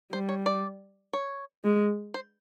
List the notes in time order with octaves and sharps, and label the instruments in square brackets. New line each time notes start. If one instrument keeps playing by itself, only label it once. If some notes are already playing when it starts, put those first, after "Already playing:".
[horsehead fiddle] G3 [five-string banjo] C5
[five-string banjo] C#5
D5
C#5
[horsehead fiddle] G#3
[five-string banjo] C5